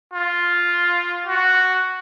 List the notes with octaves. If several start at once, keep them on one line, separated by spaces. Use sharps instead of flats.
F4
F#4